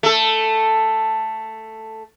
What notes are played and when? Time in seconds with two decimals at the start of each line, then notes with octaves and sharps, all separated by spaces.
0.03 A3 A4